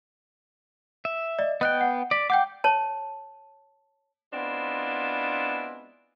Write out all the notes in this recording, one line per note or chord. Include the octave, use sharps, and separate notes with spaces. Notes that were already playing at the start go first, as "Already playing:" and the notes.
E5
D5 D#5
B3 D#5 G5 F#6
F#5
D5 B6
F#5 G5 D6 G6
C#5 A5
G#3 B3 C4 D4 E4 F4